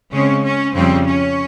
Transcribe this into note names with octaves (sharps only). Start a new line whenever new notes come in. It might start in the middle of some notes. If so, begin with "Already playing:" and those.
C#3 G#3 C4 C#4
C#4
F2 C#3 G3 C4
C#4